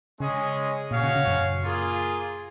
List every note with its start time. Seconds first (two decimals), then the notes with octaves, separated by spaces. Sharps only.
0.20 C#3 G#3 C#4 G#4 D#5
0.91 A#2 C#4 F#4 C#5 F5
1.03 C#3
1.16 C#3
1.27 F#2
1.63 A#3 F4 G#4